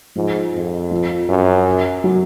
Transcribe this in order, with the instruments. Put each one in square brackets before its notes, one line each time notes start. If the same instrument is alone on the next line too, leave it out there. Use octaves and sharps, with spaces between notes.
[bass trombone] G#2 [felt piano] F3
[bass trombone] F2
[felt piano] F3
[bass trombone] F#2
[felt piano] F#3